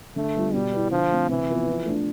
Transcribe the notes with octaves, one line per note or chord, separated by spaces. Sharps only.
D3 A3
G3 B3 F4
B2 G3
B3 E4
D3 F3
A3 C4
C3 E3
F3 B3
F3
A3 D4